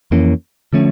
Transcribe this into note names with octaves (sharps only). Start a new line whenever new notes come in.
F2 E3 A#3 C#4
D3 F3 A3 C#4